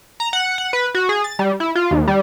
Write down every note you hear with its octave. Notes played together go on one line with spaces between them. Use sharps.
A#5
F#5
F#5
B4
F#4
G#4
A6
G3
E4
F4
D#2
G3